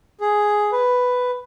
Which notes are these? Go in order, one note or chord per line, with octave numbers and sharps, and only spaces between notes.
G#4
B4